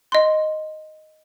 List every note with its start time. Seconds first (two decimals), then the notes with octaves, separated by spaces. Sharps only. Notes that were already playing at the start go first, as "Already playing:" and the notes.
0.12 D#5 C6